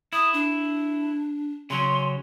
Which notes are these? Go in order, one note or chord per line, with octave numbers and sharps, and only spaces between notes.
E4 D#6
D4
C#3 F#3 C#4 C6